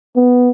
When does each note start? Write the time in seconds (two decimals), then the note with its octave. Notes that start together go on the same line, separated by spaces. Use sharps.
0.16 B3